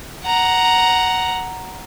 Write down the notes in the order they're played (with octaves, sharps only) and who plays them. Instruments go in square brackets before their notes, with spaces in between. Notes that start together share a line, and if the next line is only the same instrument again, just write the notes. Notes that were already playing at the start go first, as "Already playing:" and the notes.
[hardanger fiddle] F#5 A#5